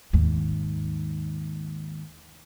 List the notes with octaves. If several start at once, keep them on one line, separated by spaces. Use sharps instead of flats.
D#2 G#2